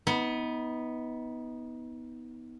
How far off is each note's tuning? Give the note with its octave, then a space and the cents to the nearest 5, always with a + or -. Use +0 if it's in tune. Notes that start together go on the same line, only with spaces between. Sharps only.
B3 +0 D#4 +30